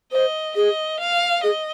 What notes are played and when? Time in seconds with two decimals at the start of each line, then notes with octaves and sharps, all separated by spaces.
0.12 C5 D#5
0.56 G#4 D#5
0.99 F5
1.43 G#4 D#5